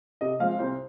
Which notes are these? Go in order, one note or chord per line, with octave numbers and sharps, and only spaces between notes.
C3 D#5
F3 G#3 C4 F5
C2 C5